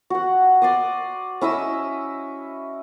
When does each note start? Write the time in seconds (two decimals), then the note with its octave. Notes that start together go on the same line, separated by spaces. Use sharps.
0.10 F#4 F#5
0.62 D5 C6 D6 D#6
1.41 C#4 E4 D#5 E6